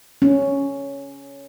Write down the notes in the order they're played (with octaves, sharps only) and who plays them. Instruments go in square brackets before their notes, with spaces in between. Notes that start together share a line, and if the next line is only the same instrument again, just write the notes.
[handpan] C#4